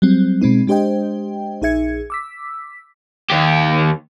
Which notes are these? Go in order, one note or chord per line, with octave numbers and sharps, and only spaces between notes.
F#3 G3 C4
B2 G#3 C4 D#4
G#3 D4 G4 C5 D#5 G5
A#1 D#4 G#4 E5 G#6 C#7
D6 E6 B6
D#2 G4